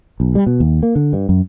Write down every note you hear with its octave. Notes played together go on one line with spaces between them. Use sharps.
B1
G3
B2
D#2
A#3
D3
G2
F#2